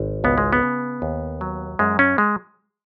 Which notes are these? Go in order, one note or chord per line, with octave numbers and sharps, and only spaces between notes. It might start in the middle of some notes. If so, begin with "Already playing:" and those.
Already playing: G#1
C#2 B3
G#3
B3
C#3
D#2
F#3
F#2 G#3
C#4
G#3